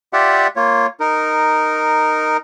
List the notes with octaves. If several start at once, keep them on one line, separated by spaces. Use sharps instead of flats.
F4 G4 D5 E5 F#5
A#3 F4 C#5
D#4 A#4